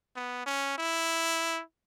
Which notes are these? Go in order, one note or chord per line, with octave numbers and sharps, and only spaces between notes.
B3
C#4
E4